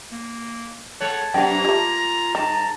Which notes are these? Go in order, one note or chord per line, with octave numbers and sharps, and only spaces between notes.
A#3
G#3 C#5 F#5 A5
F#2 C3 B3 D4 G5 A#5
G3 A3 A#3 F4
G2 D#3 A5 A#5